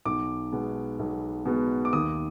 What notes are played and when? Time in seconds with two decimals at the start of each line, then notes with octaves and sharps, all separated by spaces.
0.06 B1 D6
0.52 B2 G#3 B3
0.99 B1
1.46 B2 G#3 B3
1.85 D6
1.93 D#2 D#6